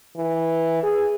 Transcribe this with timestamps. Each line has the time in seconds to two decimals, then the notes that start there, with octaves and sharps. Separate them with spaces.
0.17 E3
0.83 G#4